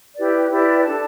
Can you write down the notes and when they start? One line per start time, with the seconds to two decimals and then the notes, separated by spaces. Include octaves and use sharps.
0.17 E4 G4 B4 D5
0.50 E4 G4 B4 D5
0.85 D4 A4 D5 A5